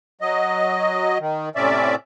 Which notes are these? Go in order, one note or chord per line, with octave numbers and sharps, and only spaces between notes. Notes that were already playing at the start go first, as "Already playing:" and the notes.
F#3 D#5
D#3
A2 C3 C#4 D5 E5